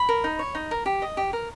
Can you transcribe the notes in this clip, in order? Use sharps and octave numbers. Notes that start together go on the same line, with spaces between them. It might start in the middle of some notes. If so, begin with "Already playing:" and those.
Already playing: B5
A#4
D#4
C#5
D#4
A#4
G4
D#5
G4
A#4